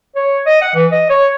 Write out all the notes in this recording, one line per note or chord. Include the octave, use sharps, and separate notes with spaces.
C#5
D#5
F#5
E3
D#5
C#5